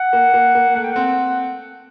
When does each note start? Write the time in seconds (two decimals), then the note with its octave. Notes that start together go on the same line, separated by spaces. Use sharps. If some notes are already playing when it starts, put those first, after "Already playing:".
Already playing: F#5
0.13 A#3
0.34 A#3
0.55 A#3
0.75 A3 F#5
0.84 G5
0.92 C4 F#5